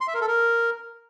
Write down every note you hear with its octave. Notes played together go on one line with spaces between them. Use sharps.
C6
E5
A#4
A4
A#4